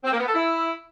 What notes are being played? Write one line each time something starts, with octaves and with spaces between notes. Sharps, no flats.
C4
A#3
B3
A4
E4